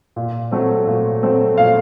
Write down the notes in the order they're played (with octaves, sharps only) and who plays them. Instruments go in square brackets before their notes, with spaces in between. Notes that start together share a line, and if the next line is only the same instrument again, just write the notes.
[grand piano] A#2
F#3 A3 C4
A#2
F#3 A3 C4
A#2 F5